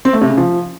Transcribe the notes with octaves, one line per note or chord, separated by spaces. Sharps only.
C4
A3
C3
C#3
F3